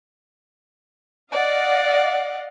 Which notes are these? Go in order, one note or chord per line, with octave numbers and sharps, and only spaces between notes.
D5 D#5 F5 F#5